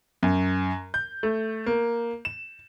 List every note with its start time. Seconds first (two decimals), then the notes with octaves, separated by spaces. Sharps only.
0.23 F#2
0.94 G6
1.23 A3
1.66 A#3
2.25 E7